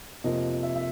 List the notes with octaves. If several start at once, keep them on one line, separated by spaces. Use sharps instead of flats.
F2 C3 F3 A#3 D#5
E5
E5